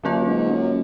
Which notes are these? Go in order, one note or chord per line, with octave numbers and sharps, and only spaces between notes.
F#2 D3 F#3 A#3 F4
G#2
F#2